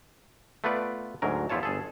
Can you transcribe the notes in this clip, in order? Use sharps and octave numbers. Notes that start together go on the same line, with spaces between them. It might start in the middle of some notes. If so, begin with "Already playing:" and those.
A3 B3 F4 B4 D5
D2 G#2 F#3 A#4
E2 F3 E4 F4 C#5 A5
G1 G#4 A4